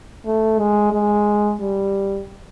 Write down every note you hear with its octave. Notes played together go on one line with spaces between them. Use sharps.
A3
G#3
G#3
G3